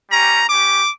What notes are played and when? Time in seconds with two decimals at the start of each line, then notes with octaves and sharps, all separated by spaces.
0.11 G3 C#4 G4 A#5
0.49 C#4 G4 D6